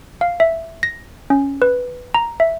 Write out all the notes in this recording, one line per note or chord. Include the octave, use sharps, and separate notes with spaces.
F5
E5
A#6
C#4
B4
A#5
E5